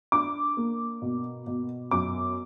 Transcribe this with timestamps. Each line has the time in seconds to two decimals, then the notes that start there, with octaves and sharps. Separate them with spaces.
0.12 D4 D6
0.57 A#3
1.02 B2
1.47 B2
1.91 F#2 D6